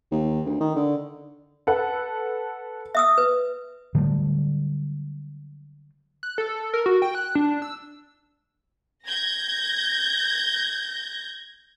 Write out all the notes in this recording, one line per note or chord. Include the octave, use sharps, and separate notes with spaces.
D#2
D2
D#3
D3
A4 B4 F#5
E5 D#6 E6
B4
D3 F#3 G3 A3
F#6
A4
A#4
F#4
G5
F#6
D4
E6
G6 G#6 A#6